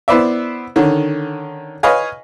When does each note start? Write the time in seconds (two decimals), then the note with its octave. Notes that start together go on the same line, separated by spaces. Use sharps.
0.08 B3 E4 B4 C5 D5 E5
0.76 D3 D#3 C#4
1.83 B4 C#5 D#5 F5 G#5